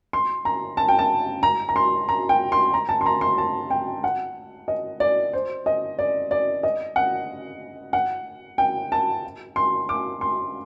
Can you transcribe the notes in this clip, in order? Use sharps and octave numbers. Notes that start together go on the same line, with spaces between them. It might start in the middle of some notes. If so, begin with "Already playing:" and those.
C6
A#5
A5
G5
A5
A#5
A#5
C6
A#5
G5
C6
A#5
A5
C6
A#5
C6
A5
G5
F#5
D#5
D5
C5
D#5
D5
D5
D#5
F#5
F#5
G5
A5
C6
D6
C6